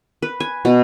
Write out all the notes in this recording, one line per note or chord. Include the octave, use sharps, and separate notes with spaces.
B4
G#5
B2